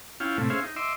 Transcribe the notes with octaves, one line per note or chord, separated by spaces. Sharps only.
C#4 E4 F4 F5 G5
A2 C3 A3
C#4 G#4 C5 E5 F5
D#4
D#5 E5 C6 D6 E6